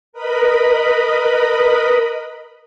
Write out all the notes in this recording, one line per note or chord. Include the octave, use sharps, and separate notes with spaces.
A#4 B4 D#5 B5